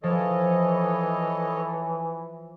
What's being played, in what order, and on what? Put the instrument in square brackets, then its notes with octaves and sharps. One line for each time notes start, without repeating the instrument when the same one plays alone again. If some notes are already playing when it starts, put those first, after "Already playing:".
[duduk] E3 [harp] F3 [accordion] A4 C#5 D#5